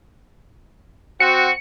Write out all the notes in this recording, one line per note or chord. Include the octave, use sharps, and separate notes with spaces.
C4 F#4 C#7